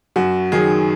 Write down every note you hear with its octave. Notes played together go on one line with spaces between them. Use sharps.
F#2 F#4
D#3 F#3 G#4